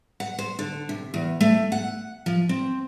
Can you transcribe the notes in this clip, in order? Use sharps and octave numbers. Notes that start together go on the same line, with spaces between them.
F#5
C5
D3
C3
E2
A3
F#5
F3
C4